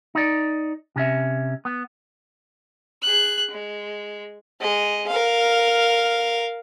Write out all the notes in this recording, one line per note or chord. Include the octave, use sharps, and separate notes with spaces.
D#4 D5
C3 C#4 E5
B3
G#4 F#6
G#3
G#3 D#5
A#4 F5